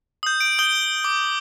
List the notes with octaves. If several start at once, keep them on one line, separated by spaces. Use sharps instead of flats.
D#6 G6
D7
D#6 G6 D7 G7
D6